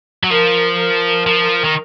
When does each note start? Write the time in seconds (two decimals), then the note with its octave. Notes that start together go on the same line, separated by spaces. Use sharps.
0.24 F#3
0.30 F3 A#4
0.78 A#4
1.26 F3
1.64 D#3